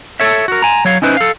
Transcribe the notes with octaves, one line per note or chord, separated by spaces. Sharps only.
A4 C#5 E5
F#4 A#4
G#5 A#5
F#3 C#5 F5
C#4 D#4 E4 B4 C5
A4 F5